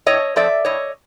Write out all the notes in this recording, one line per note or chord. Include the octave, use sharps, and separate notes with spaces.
A2 C#5 D#5
F3 A3 C4 D5 E5
A2 C#5 D#5